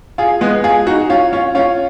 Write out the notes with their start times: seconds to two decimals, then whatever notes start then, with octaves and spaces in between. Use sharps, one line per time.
0.18 F4 G#4
0.41 G#3 B3
0.64 F4 G#4
0.87 D#4 F#4
1.10 C#4 F4
1.33 C#4 F4
1.55 C#4 F4